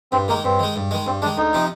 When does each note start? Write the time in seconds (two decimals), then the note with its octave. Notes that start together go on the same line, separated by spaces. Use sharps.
0.12 G2 C4
0.28 D#3 G#3 A#3
0.44 G2 C4
0.59 D#3 G#3
0.76 G2
0.91 D#3 G#3
1.06 G2 C4
1.22 D#3 G#3 D4
1.38 D2 D#4
1.53 C3 F3 C4